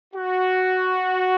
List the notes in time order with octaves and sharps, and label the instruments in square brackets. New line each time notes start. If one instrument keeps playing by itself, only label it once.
[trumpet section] F#4